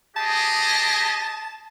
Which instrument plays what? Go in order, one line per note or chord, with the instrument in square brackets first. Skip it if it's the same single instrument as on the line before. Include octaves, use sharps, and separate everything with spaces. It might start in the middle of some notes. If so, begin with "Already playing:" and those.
[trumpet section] G4 G#4 D#5 [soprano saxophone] A5